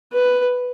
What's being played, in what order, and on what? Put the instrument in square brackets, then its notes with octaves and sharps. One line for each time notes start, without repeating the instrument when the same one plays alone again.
[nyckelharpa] B4